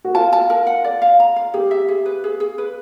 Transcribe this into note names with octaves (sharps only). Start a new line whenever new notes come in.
F#4
F4 A5
A5
A#4
F#5
D5
F5
A#5
F5
G4 G#4
E5
G#4
B4
G#4
G#4
B4